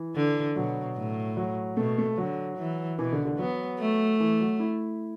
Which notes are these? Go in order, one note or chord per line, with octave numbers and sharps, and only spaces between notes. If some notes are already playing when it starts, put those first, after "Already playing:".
Already playing: E3
D3
B2 F#3
A2
F#3
B2 A3
A3
D3 F#3
E3
B2 E3
D3
D3
F#3 B3
A3
E3
F#3
E4